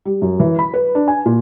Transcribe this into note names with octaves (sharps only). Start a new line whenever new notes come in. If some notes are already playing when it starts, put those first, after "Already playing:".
G3
F#2
E3
B5
B4
D4
G#5
A#2